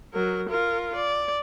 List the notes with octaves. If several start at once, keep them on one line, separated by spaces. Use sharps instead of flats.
F#3 A#4
F4 A#4
D5